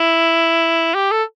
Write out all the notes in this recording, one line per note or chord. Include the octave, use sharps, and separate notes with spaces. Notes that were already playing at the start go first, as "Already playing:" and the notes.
Already playing: E4
G4
A4